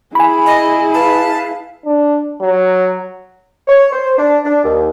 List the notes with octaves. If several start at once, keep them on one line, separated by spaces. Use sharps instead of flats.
E4 G#4 G#5 B5
D#5
B4 F5 A5
D4
F#3
C#5
C5
D4
D4
D#2